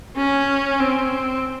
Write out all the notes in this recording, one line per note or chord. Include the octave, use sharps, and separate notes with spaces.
C#4
C4